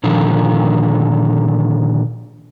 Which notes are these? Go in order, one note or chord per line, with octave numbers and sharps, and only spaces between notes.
A#2 D3 D#3 F3